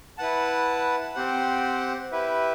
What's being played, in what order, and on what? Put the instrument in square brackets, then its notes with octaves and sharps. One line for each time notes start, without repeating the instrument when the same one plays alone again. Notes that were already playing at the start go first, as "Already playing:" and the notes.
[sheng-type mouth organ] E4 B4 F#5 A5
C4 G4 C5 F#5
E4 G4 B4 E5